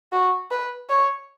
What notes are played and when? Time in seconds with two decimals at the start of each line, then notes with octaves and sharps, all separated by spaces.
0.12 F#4
0.51 B4
0.90 C#5